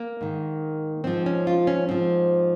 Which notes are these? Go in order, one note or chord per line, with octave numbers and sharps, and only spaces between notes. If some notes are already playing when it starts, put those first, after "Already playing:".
Already playing: A#3
G#2 D#3
G#2 F3 C4
C#4
F4
C#4
G#2 F3 C4